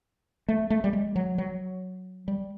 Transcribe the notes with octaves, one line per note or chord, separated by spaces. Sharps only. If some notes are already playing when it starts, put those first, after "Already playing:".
A3
A3
G3
G#3
F#3
F#3
G3